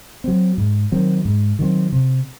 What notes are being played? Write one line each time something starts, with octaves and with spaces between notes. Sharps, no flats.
F#3 C4
G#2
D#3 F#3 C4
G#2
D#3 F#3 C4
C3